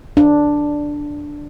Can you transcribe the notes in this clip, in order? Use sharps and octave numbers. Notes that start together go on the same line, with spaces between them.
D4